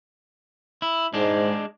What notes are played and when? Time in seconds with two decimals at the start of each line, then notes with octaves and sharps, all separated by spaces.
0.82 E4
1.14 G#2 G#3 D4